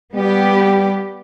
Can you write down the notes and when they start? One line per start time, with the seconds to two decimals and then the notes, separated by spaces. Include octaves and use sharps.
0.15 G3 B3 G4